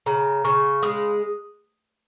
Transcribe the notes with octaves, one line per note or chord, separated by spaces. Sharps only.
C#3 A#5
C#3 C#6
G#3 D#6